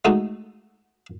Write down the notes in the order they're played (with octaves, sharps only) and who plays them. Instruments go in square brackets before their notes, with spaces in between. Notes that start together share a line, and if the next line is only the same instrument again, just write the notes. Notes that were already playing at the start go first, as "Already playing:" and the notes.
[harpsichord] G#3 A3 D#4 F#4